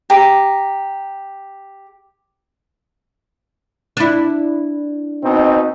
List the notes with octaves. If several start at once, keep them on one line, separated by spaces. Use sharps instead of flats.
G4 A#5
D4 E4
B2 C4 D#4